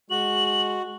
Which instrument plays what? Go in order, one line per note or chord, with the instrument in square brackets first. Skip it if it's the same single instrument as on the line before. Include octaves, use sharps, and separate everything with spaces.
[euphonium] G#3 [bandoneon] F#4 [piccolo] F#7